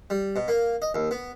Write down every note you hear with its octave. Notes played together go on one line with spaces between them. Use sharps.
G3
B2
A#3
D#5
D#2
B3